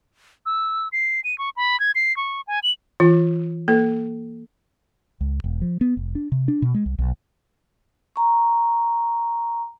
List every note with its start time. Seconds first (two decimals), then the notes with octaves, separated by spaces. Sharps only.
0.46 E6
0.92 C7
1.24 D#7
1.38 C#6
1.57 B5
1.80 G#6
1.95 C7
2.17 C#6
2.47 G#5
2.63 F#7
3.00 E3 F4
3.68 A#3 A4
5.21 C#2
5.44 E1
5.62 F3
5.81 B3
5.97 F1
6.15 D4
6.32 C3
6.48 D4
6.62 B2
6.74 G#3
6.86 C2
6.99 B1
8.16 A#5 C#6